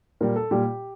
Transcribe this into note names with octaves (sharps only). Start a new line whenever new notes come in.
A#2 G3 A#4
A4
A#2 G3 G4